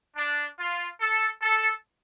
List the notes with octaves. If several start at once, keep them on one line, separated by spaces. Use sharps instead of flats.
D4
F4
A4
A4